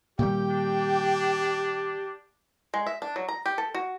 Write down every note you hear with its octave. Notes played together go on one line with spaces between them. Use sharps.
A#2 D#3 G3 G4 G5
D4
G#3
E5
D4
F#3
A#5
G4
A4
F#4